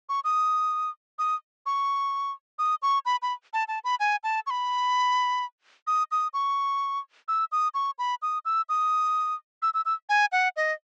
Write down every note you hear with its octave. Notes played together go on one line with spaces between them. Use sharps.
C#6
D#6
D#6
C#6
D#6
C#6
B5
B5
A5
A5
B5
G#5
A5
C#6
B5
D#6
D#6
C#6
E6
D#6
C#6
B5
D#6
E6
D#6
E6
E6
E6
G#5
F#5
D#5